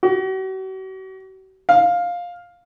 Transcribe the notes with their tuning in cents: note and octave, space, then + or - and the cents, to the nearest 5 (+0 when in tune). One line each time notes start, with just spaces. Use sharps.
F#4 +40
F5 +10